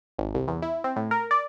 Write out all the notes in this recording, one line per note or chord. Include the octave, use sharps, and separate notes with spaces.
G#1
C2
E2
E4
C4
A2
A#4
D5